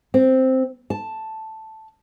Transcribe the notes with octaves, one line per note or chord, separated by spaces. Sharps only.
C4
A5